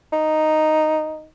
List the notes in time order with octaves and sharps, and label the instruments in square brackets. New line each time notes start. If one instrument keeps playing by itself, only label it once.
[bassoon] D#4